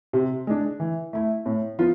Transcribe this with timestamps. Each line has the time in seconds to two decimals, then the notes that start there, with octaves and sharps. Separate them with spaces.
0.13 C3
0.47 G#3 D4
0.80 E3
1.13 A3 E4
1.46 A2
1.79 F3 B3 F4